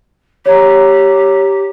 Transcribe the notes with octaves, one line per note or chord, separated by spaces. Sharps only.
G4 C#5 A#5